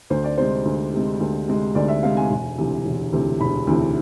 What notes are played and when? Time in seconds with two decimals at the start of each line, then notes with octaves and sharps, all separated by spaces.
0.10 D2 C5
0.24 D5
0.38 C3 G#3 C5
0.65 D2
0.93 C3 G#3
1.20 D2
1.47 C3 G#3
1.75 D2 D5
1.88 E5
2.03 C3 G#3 F5
2.17 G#5
2.30 E1
2.58 D2 C3 E3
2.85 E1
3.12 D2 C3 E3
3.40 E1 B5
3.67 D2 C3 E3